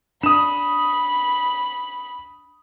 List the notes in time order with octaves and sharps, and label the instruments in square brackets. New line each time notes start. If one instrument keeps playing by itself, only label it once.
[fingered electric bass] D4 [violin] B5 [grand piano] D#6 E7